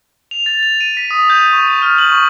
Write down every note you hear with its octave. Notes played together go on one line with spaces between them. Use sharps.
F7
A6
F7
D#7
B6
D#6
G6
C#6
C#6
F6
F#7
C#6